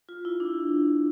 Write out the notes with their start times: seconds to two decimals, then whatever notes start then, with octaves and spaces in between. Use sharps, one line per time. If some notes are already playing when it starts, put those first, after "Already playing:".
0.09 F4
0.25 E4
0.40 D4